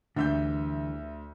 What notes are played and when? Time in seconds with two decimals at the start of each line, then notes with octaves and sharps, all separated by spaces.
0.16 D2 D3 E3 G3 E5 G6